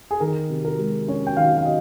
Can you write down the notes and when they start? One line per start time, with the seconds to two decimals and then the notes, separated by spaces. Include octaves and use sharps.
0.11 G#4
0.20 D#3 A#4
0.50 C3
0.65 A#4
0.79 G#3
1.08 C#4 C#5
1.27 G5
1.37 D#3 F5
1.57 F5
1.65 D#5